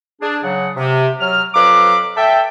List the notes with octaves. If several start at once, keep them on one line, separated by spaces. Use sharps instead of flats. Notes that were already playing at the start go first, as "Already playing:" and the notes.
D4 G#4
C#3 F#3 F#5
C3
F#3 F6
F2 F#3 B4 F5 D6
A4 E5 G5